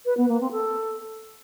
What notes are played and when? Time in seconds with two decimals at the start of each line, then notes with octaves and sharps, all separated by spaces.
0.06 B4
0.17 B3
0.29 A#3
0.40 C4
0.52 A4